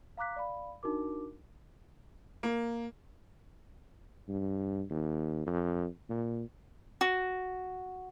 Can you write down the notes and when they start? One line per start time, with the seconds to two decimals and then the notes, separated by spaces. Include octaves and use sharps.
0.18 F5 A#5 D6 F#6 B6
0.36 D5 F5 B5
0.83 D4 D#4 F#4 A#4 D6
2.43 A#3
4.28 G2
4.90 D#2
5.46 F2
6.10 A#2
7.01 F#4